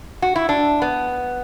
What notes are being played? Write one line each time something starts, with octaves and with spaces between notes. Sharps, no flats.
F#4
E4
D4
B3